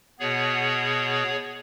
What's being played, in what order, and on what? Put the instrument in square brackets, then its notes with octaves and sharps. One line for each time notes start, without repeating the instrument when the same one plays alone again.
[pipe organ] B2 B3 G#4 C#5